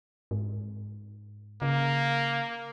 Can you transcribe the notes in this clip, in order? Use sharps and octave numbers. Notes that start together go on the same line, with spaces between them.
G#2
C#3 A#3